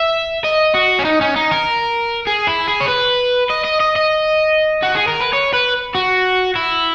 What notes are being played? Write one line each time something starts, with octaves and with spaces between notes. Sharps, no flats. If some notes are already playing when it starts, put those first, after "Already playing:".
Already playing: E5
D#5
F#4
C#4
D#4
C#4
D#4
A#4
G#4
E4
G#4
C#5
B4
D#5
D#5
D#5
D#5
F#4
G#4
A#4
B4
C#5
B4
F#4
E4